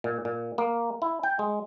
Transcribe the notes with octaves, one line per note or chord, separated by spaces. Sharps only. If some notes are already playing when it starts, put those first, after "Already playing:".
A#2
A#2
A#3
E4
G5
G#3